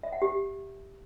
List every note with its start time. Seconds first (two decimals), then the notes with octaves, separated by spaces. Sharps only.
0.03 E5
0.13 F#5
0.22 G4